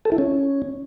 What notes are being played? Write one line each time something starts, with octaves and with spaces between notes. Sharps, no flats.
A4
E4
C#4